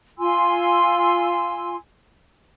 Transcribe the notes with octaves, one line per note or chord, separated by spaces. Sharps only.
F4 G#5 C6 E6